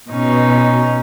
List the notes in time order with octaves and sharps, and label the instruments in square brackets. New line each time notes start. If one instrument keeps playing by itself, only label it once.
[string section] B2 [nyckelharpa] C#4 D#4